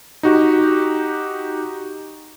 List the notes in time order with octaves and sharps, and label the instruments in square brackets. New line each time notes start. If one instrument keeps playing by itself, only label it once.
[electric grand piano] D#4 F#4 G4